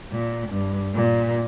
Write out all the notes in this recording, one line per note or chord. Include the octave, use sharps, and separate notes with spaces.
A#2
G2
A#2